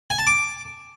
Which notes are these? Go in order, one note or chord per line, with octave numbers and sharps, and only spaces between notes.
G#5
A5
D6